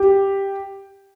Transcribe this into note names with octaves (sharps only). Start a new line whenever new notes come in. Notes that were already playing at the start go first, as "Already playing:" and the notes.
Already playing: G4